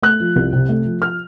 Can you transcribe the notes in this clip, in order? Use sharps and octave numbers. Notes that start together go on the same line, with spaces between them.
A3 F#6
F3
C2
C3
A3
F3
F6